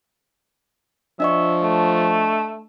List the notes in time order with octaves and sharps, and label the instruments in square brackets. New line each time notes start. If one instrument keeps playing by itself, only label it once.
[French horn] F3 [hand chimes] D4 D#5 C#6 [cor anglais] E5
[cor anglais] A3